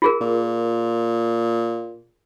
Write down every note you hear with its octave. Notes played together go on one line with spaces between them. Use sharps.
F4 G#4 A#4
A#2